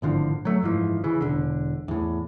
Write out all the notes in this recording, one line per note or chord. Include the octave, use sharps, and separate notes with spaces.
G#1 A2 D3 F3
F#3 A3
F#1 G#2 E3 F3
C#3 E3
E1 D3
E2 A2